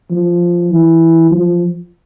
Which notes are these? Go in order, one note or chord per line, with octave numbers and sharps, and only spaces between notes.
F3
E3
F3